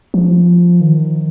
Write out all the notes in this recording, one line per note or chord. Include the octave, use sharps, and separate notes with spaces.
F3
D#3